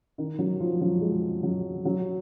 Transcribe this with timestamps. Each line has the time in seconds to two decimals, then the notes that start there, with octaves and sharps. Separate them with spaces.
0.18 D#3
0.39 F#3
0.60 F3
0.81 F#3
1.01 G#3
1.43 F#3
1.85 F#3